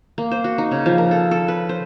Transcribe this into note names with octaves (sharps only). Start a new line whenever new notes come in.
A#3
C5
F#4
D#4
C#3
F3
A#4
A4
A4
B4
C5